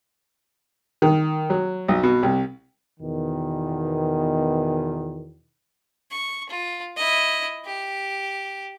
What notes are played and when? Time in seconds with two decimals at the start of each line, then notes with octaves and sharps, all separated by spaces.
1.02 D#3
1.50 F#3
1.88 B1
2.03 B2
2.23 C2
3.00 E2 B2 D#3
6.12 C#6
6.50 F4
6.97 E4 D#5
7.66 G4